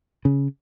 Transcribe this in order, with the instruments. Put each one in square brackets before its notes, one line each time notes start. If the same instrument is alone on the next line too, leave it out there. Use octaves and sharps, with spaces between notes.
[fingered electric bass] C#3